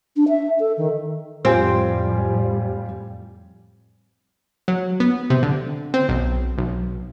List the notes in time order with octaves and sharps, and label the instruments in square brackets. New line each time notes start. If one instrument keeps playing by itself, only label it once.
[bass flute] D4
E5
A4
D#3
[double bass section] F2 A2 G3 [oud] C4 [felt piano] F4 G4 G#5
[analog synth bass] F#3
B3
C3
D3
C4
B1
B1